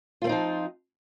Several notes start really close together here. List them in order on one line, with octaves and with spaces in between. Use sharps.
F4 A3 C4 D#4 F3